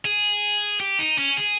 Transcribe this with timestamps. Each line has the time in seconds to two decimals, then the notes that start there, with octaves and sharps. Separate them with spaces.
0.05 G#4
0.80 G4
0.99 D#4
1.18 C#4
1.37 G#4